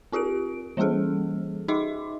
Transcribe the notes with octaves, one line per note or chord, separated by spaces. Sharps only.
C4 F4 G4 A#4 D7
E3 G3 A#3 C#4 G#4 A4
D#4 G#4 D#5 E5 C6 D6